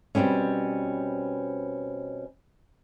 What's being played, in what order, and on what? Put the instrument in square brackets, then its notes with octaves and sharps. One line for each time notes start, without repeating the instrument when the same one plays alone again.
[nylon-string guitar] B2 F#3 G3 C4 C#4